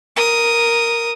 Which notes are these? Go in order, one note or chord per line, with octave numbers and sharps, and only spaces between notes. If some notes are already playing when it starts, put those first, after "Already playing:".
A#4 D#6